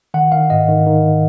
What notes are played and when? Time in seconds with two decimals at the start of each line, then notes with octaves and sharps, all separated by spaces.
0.14 D#3 F#5
0.32 D#3 F5
0.50 G#2 D#5
0.69 D#3
0.86 D#3